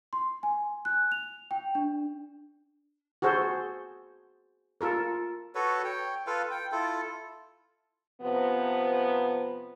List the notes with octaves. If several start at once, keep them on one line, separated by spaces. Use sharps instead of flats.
C6
G#5
F#6
F7
G5
D4
F#4 G#4 A4 C5
F4 A4 A#4
F#4 A4 B4 C#5
C#5 G5
F4 A4 B4 F5
G5
E4 F4 A4
C3 F3 B3